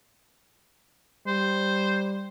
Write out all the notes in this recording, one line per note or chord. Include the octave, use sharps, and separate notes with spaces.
G3 C5